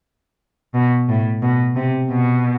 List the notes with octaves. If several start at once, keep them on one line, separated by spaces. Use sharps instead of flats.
B2
A2
B2
C3
B2